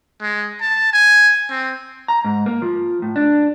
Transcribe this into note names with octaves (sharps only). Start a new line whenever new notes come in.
G#3
A5
G#5
C4
A#5
G#2
A#3
F3
A2
D4